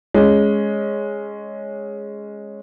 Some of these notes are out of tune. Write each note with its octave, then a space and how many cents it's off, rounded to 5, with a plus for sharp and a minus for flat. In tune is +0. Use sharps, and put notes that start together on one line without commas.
G#3 +0 C#4 +0